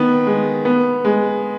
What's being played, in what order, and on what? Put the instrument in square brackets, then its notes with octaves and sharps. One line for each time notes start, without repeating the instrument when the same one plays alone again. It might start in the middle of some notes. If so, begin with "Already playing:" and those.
Already playing: [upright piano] D#3 B3
G#3
B3
G#3